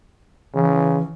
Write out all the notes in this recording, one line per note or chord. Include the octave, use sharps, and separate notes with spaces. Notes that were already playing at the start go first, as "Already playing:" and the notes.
C#3 E3